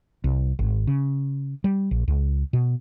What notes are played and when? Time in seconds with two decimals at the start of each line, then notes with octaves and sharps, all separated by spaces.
0.24 C2
0.59 G#1
0.87 C#3
1.64 G3
1.91 A#1
2.08 C#2
2.53 B2